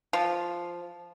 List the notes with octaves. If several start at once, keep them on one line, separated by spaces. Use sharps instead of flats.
F3